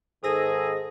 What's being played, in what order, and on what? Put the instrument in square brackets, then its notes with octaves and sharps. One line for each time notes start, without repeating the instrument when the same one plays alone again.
[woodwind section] G#2 [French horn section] D#3 A4 [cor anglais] G#4 [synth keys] D#6 E6 A#6